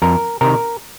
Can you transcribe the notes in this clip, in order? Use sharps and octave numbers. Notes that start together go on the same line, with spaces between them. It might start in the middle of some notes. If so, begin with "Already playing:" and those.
F2 A#4
C3 D#3 A#4